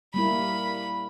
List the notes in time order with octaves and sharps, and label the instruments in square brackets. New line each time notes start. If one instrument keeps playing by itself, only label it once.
[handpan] G3 A#3 E4 [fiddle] B5